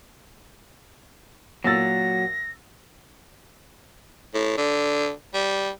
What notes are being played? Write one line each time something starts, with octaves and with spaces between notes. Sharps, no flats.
A#2 F#3 E6 A6 A#6
A2
D3
G3